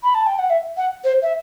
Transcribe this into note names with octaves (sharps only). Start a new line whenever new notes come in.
B5
A5
G5
F#5
E5
F#5
C5
E5